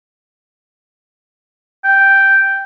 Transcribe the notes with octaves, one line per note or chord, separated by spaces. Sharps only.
G5